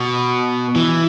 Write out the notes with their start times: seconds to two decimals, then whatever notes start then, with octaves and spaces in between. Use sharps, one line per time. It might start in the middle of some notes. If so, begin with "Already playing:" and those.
Already playing: B2
0.76 E3